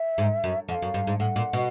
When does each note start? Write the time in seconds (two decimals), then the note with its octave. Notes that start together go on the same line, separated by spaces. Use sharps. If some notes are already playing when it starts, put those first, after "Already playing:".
Already playing: E5
0.18 G#2
0.44 F#2
0.68 F2 F#5
0.75 F5
0.82 F#2
0.94 G2
1.07 G#2
1.20 A2 F#5
1.36 A#2
1.53 B2